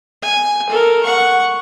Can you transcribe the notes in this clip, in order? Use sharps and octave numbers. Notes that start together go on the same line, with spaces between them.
G#5
A4 A#4
F#5 C#6